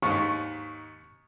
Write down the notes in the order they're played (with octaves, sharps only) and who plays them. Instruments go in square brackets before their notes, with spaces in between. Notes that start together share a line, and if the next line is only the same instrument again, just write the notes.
[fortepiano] D#2 G#2 [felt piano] C#6